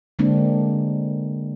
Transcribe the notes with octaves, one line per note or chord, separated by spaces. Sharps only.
D3 G#3 A#3 C4 D4